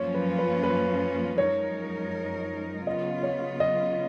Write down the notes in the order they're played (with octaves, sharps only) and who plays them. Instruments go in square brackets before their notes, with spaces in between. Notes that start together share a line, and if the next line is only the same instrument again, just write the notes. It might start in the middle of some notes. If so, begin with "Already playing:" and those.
Already playing: [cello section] F#2 F3 A#3 C#4 F4 [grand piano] C#5
[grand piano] B4
B4
B4
[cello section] F#2 F3 G#3 D#4 A#4 [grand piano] C#5
[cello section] C#3 F#3 B3 F4 [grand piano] D#5
[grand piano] C#5
D#5